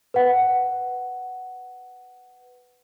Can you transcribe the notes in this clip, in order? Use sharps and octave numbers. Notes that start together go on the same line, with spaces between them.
B4 F#5